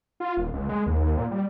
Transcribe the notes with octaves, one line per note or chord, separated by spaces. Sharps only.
F4
D#1
C#2
G#3
D#2
D#2
A#2
G3